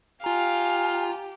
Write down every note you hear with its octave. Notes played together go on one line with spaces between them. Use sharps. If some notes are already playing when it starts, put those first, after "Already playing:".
F4 G4 F5 G#5 A#5